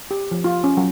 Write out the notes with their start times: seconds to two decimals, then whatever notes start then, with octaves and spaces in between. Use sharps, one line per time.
0.11 G4
0.31 F3
0.44 F4
0.64 C#4
0.77 F#3